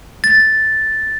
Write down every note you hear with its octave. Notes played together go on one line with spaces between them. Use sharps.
A6